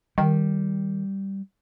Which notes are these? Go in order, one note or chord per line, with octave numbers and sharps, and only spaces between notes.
D#3 G3